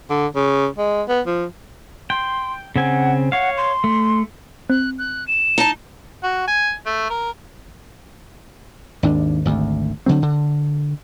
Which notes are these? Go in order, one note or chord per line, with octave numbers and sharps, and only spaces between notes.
D3
C#3
G#3
B3
F3
G5 C6
C#3 C4 F#5 G#5
C#5 F5 F#5
C6
A3
C4 F#6
F#6
E7
D#4 A5
F#4
G#5
A3
A#4
G#1 D#2 D4
G#1 D2
D3 E3 F#3 C4
D3